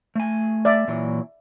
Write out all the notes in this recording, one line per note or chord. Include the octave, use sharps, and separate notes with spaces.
A3 G#5
D5 E5
A#2 E3 F#3